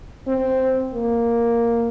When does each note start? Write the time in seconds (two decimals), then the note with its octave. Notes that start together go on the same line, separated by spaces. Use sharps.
0.28 C4
0.94 A#3